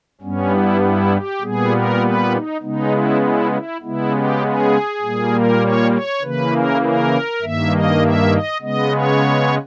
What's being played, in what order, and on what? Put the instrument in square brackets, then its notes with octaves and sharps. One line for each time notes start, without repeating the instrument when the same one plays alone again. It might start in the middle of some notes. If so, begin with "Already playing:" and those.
[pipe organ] G2 G3 B3 C#4
E4
E4
G4
A#2 G3 B3 G#4
A#4
B4
D#4
C#3 G#3 B3 D#4
E4
E4
E4
C#3 G#3 B3 E4
G4
G#4
A#2 G3 A#3
A#4
C#5
C#5
C#3 E3 A#3 B4
A#4
A#4
G2 D#3 A#3 E5
D#5
E5
D#5
C#3 G#3 B3 D#5
C#5